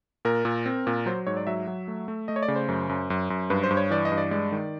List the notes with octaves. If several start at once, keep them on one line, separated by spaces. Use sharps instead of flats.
A#2 A#4
A#2
C4
A#2
F#3 C5
G#2 C#5
D5
F#3 E5
F#3
A3
A3
A3 D#5
C#5
D5
C#3
C5
F#2
F#2
F#2
F#2
G2 B4
C5
G2
C#5
E3 D5
D#5
G2
D5
G#3 D5
D#3